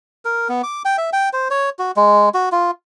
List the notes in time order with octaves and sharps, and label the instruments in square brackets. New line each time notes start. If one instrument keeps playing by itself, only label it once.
[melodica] A#4
B3
D6
G5
E5
G5
C5
C#5
F#4
G#3
F#4
F4